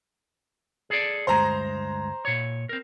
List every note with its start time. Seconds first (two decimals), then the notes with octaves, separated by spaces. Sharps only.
0.90 G#4 A4 D5
1.27 D2 G2 G#3 C5 A#5
2.25 A#2 C#5
2.69 C4 A#4